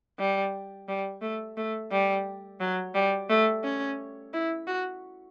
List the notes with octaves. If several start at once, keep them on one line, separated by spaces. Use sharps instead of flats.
G3
G3
A3
A3
G3
F#3
G3
A3
C#4
E4
F#4